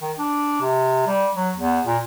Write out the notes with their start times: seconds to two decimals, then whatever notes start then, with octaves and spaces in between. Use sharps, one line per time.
0.01 D#3
0.19 D4
0.62 C3
1.07 G3
1.35 F#3
1.56 E2
1.87 A#2